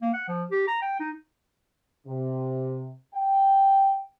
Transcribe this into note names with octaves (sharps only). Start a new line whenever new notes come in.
A#3
F#5
F3
G4
A#5
G5
D#4
C3
G5